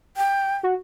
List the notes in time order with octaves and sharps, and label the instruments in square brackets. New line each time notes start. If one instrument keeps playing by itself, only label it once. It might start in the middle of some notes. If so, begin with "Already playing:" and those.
[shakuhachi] G5
[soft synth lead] F#4